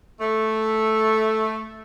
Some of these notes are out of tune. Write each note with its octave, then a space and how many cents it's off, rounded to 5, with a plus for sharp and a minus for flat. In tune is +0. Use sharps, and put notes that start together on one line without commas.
A3 -5